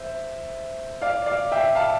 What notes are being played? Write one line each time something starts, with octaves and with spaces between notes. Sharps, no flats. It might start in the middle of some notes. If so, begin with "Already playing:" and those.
Already playing: C5 E5
D5 F5
D5 F5
E5 G5
F5 A5